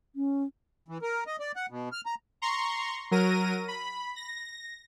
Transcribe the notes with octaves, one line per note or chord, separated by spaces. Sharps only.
C#4
E3
A#4
D#5
D5
F#5
B2
F6
A#5
A#5 C6 C#6
F#3 A#4 A#6 D#7
B5
A#6